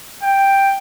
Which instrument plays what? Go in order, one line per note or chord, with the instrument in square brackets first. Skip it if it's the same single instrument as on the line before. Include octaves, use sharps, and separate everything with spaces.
[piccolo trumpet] G5